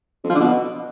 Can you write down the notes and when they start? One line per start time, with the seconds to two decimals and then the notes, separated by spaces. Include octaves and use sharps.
0.24 F2
0.29 F3
0.35 D3
0.40 B2